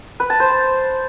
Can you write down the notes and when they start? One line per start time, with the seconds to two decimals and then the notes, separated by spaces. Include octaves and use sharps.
0.20 B4
0.30 A5
0.40 C5